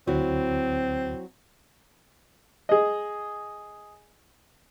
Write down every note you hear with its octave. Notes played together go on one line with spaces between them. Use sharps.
D2 F#3 C4 E4 F#4
G#4 D#5